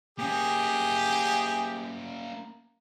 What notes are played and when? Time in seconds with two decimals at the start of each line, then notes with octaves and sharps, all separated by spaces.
0.19 A#3 C#4 G4 G#4